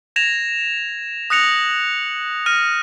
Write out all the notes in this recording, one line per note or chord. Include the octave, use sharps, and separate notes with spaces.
G#6 A#6 E7 F7
D#6 F#6 A#6 C#7 F7
F6 A#6 D#7